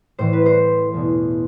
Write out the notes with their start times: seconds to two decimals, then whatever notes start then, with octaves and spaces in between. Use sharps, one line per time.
0.19 A2 E3 C5
0.33 B4
0.46 C5
0.94 E2 B2